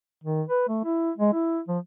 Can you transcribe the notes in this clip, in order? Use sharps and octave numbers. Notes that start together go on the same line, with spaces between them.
D#3
B4
A3
E4
G#3
E4
F3